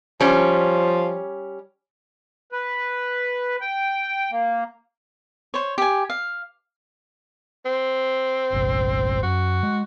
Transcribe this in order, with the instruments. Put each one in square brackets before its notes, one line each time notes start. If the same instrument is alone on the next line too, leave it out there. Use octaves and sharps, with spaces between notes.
[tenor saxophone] F3 [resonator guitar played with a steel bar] G3 C#4
[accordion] B4
G5
A#3
[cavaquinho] C5 C#5
G4 G#5
F5
[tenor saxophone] C4
[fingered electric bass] G1 C2
[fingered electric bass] F#2 [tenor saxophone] F#4
[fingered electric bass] G#3